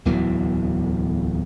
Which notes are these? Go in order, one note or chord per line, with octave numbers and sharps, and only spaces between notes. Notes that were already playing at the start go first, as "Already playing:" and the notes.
D1 E2 E3 F#3